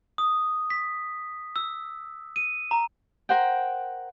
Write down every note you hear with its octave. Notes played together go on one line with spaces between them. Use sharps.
D#6
B6
E6
D#7
A#5
A#4 C5 F#5 G5